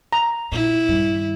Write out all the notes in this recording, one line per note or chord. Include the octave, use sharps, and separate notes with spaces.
A#5
A#2 E4
G2 D#3